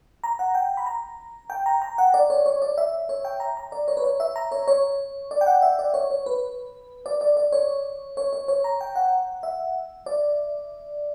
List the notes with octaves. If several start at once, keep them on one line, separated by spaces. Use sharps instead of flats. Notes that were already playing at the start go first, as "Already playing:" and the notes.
A#5
F#5
G5
B5
A#5
G5
A#5
A#5
F#5
D5
C#5
C#5
D5
E5
C#5
G5
A#5
A#5
D5
C#5
B4
C#5
E5
A#5
C#5
C#5
D5
G5
F#5
E5
D5
C#5
C#5
B4
D5
D5
D5
C#5
C#5
C#5
C#5
A#5
G5
F#5
E5
D5